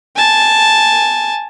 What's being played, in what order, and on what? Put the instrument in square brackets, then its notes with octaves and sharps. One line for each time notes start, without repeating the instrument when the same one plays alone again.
[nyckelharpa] G#5 A5